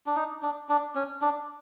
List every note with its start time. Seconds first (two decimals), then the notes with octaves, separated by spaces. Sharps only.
0.06 D4
0.16 D#4
0.43 D4
0.69 D4
0.95 C#4
1.22 D4